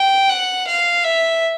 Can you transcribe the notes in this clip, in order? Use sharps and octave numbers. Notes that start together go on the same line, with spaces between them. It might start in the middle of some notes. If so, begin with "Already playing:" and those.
Already playing: G5
F#5
F5
E5